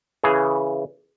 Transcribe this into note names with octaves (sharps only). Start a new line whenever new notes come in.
C#3 E3 G#4